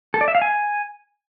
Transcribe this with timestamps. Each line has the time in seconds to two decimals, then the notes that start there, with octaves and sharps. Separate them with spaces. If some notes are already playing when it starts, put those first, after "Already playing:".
0.14 A4
0.21 D5
0.28 E5
0.35 F5
0.42 G#5